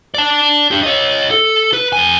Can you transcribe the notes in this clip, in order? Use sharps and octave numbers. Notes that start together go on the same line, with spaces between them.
D5 A5
D4 G4
C#5 D#5
A4
B4
F2 G#5